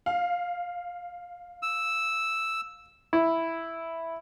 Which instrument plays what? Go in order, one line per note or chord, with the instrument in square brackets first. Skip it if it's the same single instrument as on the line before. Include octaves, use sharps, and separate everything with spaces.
[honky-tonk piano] F5
[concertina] E6
[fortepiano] E4